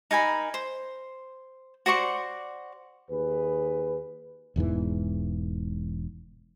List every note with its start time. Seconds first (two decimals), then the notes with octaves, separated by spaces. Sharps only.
0.11 D#4 A#4 G#5 B5
0.54 C5
1.86 F#4 C5 D5 C#6
3.09 D#2 G#4 B4
4.56 E1 E2 G#2 E3